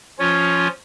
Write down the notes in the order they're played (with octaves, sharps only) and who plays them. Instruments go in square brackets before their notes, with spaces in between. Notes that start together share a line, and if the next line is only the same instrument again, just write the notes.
[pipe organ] F3 C#4 F4 [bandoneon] C#5